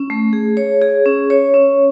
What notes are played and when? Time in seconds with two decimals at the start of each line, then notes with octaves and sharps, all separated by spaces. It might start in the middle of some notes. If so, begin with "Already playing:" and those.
Already playing: C#4
0.10 A3
0.33 G#4
0.57 C#5
0.82 G#4
1.06 C#4
1.30 C#5
1.54 C#4